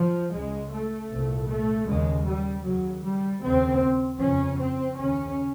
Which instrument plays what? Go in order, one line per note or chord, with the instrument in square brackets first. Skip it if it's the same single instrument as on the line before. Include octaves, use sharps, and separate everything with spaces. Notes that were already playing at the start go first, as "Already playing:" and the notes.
Already playing: [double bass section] F3
C#2 C#3 G#3
A3
C2 A#2
A3
D#2 C#3 G#3
G3
D#2 C#3 F#3
G3
D#2 C#3 C4
F2 C#3 C#4
C4
D#2 C#3 C#4